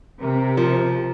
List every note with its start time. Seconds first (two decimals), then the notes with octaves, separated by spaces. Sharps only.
0.22 C3 A#4
0.57 F3 F4 A#4